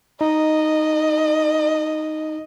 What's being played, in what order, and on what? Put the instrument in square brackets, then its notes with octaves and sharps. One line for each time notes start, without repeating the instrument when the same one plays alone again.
[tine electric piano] D#4 [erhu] D#5